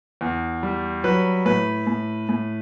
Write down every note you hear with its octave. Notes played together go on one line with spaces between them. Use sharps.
E2
G3
F#3 B4
A2 B4
A2
A2